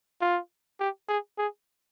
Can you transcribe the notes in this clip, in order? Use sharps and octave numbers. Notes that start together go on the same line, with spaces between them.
F4
G4
G#4
G#4